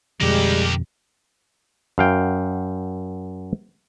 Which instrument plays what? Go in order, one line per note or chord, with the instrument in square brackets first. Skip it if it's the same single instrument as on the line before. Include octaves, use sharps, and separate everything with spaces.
[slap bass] F2 B2 D3 [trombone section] G3 G#3 [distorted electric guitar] A#3 G4
[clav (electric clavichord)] F#2 F5 G5